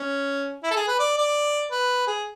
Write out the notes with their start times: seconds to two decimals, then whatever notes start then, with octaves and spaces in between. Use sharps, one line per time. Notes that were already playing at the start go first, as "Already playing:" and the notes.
Already playing: C#4
0.64 E4
0.71 A4
0.76 G#4
0.88 B4
0.99 D5
1.18 D5
1.71 B4
2.07 G#4